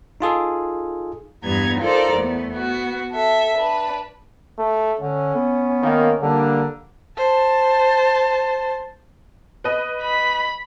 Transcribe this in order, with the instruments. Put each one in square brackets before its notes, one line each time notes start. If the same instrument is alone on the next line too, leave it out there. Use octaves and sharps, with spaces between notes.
[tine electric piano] D#4 F4 G#4 A4
[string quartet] E2 G2 G3 B3 A#5 G#6
D#4 F4 A4 A#4 C5 D5
E2 A3 B3
B3 F#4
A4 E5
D4 B4
[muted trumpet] A3
[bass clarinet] D3 [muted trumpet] C#4
[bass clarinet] B3
[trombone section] D#3 A#3
[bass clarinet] D3 [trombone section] G3 A#3 D4
[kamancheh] C5 A5
[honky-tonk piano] B4 D#5
[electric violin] B5